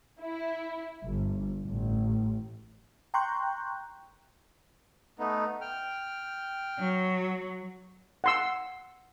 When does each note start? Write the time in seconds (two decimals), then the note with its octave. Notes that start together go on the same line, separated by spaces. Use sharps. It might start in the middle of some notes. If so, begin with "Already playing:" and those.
0.21 E4
1.04 G1
1.65 A1
3.14 G5 A#5 C6 C#6 F#6 G6
5.19 A3 B3 D#4
5.61 G5 F6
6.79 F#3
8.24 F#5 C6 E6